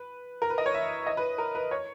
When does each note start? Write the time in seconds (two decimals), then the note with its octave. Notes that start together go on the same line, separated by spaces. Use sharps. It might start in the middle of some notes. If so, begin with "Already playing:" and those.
Already playing: B4
0.42 A#4
0.50 B4
0.58 D#5
0.66 C#5
0.74 E5
1.07 D#5
1.17 B4
1.38 A#4
1.55 B4
1.71 C#5